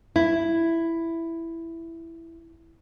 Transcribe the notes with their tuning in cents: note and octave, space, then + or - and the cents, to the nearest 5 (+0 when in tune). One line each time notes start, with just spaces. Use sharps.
E4 +5